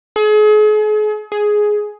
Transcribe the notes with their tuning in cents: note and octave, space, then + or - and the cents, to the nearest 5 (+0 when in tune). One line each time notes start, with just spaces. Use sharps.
G#4 +40
G#4 +10